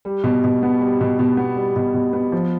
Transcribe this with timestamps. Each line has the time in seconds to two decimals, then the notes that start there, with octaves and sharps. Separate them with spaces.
0.05 G3
0.24 B2
0.44 B2
0.63 B3
0.81 G3
1.01 B2
1.19 B2
1.37 B3
1.57 G3
1.76 B2
1.94 B2
2.13 B3
2.32 F3